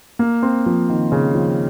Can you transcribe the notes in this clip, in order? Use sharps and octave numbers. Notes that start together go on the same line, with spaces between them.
A#3
C4
F3
D#3
C#3
F3